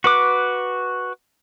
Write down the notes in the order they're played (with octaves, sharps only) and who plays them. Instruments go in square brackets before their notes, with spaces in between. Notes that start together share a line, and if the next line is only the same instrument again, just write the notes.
[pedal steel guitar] F#4 B4 D6